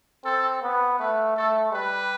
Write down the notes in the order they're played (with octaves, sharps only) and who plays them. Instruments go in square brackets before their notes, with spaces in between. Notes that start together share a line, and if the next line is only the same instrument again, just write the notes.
[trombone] C4 [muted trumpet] A4
[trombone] B3
[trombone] A3 [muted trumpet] B4
[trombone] A3 [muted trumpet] A4
[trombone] G3 [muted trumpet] B4